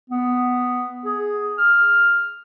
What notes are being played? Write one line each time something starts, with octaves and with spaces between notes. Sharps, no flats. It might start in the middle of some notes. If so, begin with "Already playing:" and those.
B3
G#4
F6